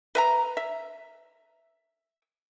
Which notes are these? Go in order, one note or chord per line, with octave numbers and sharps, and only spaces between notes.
B4 E5 A#5
E5